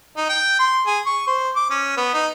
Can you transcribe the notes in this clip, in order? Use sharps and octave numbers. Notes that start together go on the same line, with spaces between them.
D#4
G5
C6
G#4
C#6
C5
D6
C#4
B3
D#4